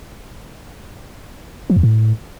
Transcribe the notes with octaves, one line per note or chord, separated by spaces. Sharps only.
F3
E2
A2